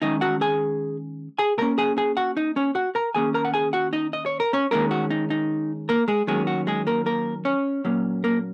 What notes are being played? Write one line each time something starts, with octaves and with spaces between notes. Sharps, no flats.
D#3 G#3 C#4 D#4 D#5
F#4 F#5
G#4 G#5
G#4 G#5
A#2 A#3 C#4 A#4 A#5
G#4 G#5
G#4 G#5
F#4 F#5
D#4 D#5
C#4 C#5
F#4 F#5
A#4 A#5
D#3 A#3 C#4 G#4 G#5
A#4 A#5
F#5
G#4 G#5
F#4 F#5
D#4 D#5
D#5
C#5
A#4
C#4 C#5
D#3 G#3 A#3 C#4 A#4
F#4
D#4
D#4
A#3 A#4
G#3 G#4
D#3 F#3 G#3 A#3 C#4 G#4
F#4
G#3 G#4
A#3 A#4
A#3 A#4
C#4 C#5
A#2 F#3 A#3 C#4
A#3 A#4